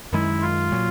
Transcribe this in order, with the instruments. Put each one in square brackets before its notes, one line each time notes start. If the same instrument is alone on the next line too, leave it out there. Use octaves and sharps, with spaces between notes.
[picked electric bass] F#2 D#3 G#3 [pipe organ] E4
[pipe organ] F4
[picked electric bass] A#2 F#3